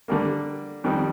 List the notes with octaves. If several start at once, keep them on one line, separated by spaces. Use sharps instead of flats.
D3 G3 A#3
F2 D#3 G3